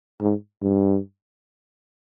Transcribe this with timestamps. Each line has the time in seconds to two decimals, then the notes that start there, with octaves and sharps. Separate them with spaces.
0.21 G#2
0.62 G2